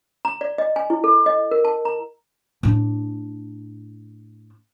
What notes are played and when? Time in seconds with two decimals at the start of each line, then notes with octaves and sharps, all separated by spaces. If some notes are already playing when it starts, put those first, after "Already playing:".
0.25 A#5
0.41 D5
0.58 D#5
0.76 G#5
0.90 E4
1.04 A4
1.26 D#5
1.51 A#4
1.65 A5
1.85 A#5
2.63 A2 D4